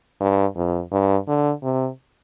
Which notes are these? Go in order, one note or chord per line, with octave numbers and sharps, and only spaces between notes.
G2
F2
G2
D3
C3